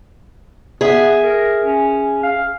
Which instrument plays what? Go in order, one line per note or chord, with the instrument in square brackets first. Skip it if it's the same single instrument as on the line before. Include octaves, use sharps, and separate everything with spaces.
[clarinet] B3 [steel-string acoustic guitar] G#4 E5
[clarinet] A#4
C#4
F5